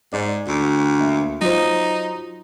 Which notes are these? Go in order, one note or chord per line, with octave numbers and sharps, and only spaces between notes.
G#2 D5
D2
A#3 E5
F#3 D#4 F4 C5